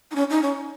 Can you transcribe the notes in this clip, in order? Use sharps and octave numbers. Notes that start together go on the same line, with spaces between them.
D#4
C#4
D#4
C#4